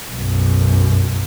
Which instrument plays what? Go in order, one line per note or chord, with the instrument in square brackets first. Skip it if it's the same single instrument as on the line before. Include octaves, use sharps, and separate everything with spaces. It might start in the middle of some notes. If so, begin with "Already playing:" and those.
[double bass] B1 F#2